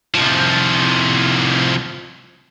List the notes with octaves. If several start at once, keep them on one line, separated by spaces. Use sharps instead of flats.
C2 F3